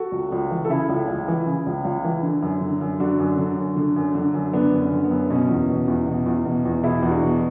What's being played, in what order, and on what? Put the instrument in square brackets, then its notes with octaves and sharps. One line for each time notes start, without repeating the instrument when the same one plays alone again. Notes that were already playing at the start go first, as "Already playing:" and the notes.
Already playing: [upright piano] F#4 A4
C#2
C#2
E3
A4
C#3 E4 G#4
C#2
C#2
E3
C#3
C#2
C#2
E3
D3
F#2
D3
F#2
D3 D4 F#4
F#2
D3
F#2
D3
F#2
D3
F#2
D3 B3 D4
F#2
C#4
D3
B3
F#2
B2 C#4
E2
B2
E2
B2
E2
B2
E2
B2 E4 G#4
E2
D4 F#4
B2